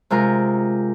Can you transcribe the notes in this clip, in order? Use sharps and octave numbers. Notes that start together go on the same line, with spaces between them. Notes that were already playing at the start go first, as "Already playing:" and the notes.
C3 G#3 F4 A#4